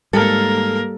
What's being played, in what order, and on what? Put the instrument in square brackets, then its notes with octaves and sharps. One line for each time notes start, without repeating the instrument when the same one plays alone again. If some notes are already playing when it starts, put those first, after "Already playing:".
[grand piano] G#2 [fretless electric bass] G3 [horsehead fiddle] A#3 A#4 [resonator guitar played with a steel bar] A4